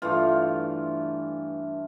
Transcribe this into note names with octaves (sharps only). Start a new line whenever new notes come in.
G2 E3 A3 F4